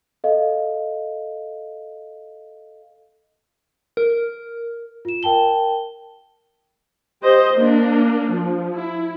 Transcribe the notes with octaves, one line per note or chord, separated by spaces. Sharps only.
A4 D#5 F5
A#4
F4 E7
A#4 G5 A5 G7
G4 C5 D#5
A#3 D4
F3
E4